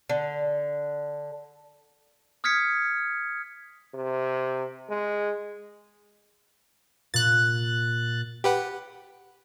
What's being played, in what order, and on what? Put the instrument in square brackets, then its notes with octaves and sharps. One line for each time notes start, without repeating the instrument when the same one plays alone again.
[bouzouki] D3
[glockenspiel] D#6 F6 G#6 B6 C#7
[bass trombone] C3
G#3
[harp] A#2 [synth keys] F#6 A6
[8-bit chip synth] G4 B4 F#5